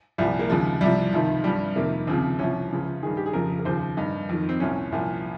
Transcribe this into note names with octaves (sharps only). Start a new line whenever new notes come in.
C2 A#2 F3 G3
A#3
D#2 C#3 F3 G#3
C2 C3 F3 G3
C#2 C3 D#3 F3
G2 F3 G3
F2 C3 D#3 A#3
D#2 C#3 F3 C4
C2 C3 F3 C#4
C#2 C#3 F3
G2 D#3 G#4
G4
G#4
F2 C#3 F3 A#4
A#4
D#2 C#3 F3 C5
G2 D#3 D#4
F2 D#3
C4
C2 A#2 F3 C#4
C2 A#2 F3